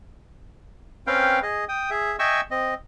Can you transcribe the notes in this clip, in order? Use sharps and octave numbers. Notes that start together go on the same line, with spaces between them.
C4 C#4 B4 F5 G5
G#4 D#5
G5 D#6
G#4 E5
D#5 E5 G5 G#5 C#6 E6
C4 D#5